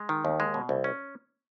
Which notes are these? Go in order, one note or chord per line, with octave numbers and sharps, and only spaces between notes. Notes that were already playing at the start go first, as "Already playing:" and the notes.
Already playing: G#3
D#3
D#2
G#3
B2
C2
C#4